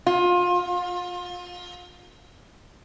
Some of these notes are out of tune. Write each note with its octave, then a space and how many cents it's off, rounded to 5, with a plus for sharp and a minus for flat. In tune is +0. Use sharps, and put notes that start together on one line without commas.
F4 +25